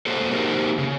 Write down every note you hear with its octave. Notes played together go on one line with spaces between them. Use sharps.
A#3 F#4 G#4 A4 C5
A#3 D#4 F#4 G4 A#4 C5
C#3